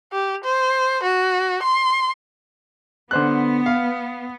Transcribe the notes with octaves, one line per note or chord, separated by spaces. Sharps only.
G4
C5
F#4
C6
D3 B3 C5 F#6
F5